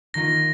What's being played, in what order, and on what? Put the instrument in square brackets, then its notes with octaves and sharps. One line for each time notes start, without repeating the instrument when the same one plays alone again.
[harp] D#3 A#3 F4 [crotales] A#6